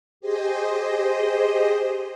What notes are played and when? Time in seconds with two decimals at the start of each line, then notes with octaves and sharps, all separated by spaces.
0.20 G4 G#4 C5 D#5